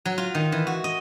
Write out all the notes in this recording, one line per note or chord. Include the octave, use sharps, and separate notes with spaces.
F#3
F4
D#3
E3
F#4
D#5